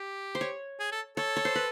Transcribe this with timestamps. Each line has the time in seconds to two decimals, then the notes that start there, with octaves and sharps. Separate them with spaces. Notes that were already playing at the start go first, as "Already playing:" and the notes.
Already playing: G4
0.35 C5
0.41 C#5
0.79 G#4
0.92 A4
1.17 A4 C#5
1.37 C#5
1.45 C5
1.55 B4